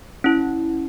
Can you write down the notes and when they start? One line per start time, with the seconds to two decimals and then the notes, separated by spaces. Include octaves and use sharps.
0.24 C#4 E4